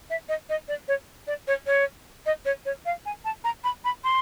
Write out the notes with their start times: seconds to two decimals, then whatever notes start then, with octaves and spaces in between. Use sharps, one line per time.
0.10 E5
0.29 D#5
0.49 D#5
0.68 D5
0.88 C#5
1.27 D5
1.48 C#5
1.67 C#5
2.26 D#5
2.45 C#5
2.66 C#5
2.86 F5
3.06 G#5
3.25 A5
3.44 A#5
3.64 B5
3.84 B5
4.04 C6